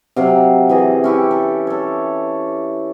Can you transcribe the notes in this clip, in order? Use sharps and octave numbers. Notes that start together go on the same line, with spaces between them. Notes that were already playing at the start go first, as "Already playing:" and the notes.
C3 F#3 F5
E3 G#4 D#5
C#4 E4 G4
A4
A4 C#5